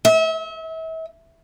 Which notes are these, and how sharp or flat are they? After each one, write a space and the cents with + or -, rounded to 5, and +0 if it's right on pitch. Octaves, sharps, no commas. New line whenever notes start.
E5 -35